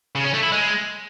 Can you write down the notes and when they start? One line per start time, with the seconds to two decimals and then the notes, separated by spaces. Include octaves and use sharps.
0.15 C#3
0.24 C#4
0.34 A3
0.43 E4
0.52 G#3